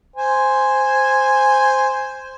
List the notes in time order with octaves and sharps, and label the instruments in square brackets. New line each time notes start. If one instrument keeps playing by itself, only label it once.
[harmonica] C5 G#5